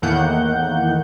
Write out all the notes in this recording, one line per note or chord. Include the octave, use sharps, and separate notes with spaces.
E2 A2 D#3 A#3 F#5 G6